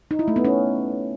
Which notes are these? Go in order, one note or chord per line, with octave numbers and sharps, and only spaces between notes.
D#4
E4
A3
B3
C#4